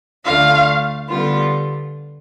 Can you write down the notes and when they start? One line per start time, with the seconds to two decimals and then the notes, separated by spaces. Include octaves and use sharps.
0.25 D2 D3 A3 D4 F4 F5
1.09 D3 G3 B3 F4